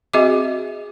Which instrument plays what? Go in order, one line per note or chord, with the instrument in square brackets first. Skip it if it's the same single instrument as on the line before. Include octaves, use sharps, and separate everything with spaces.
[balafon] C4 F#4 G#4 D#5 E5 D6